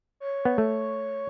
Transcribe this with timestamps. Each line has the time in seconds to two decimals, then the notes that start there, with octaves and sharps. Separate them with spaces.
0.20 C#5
0.45 B3
0.58 A3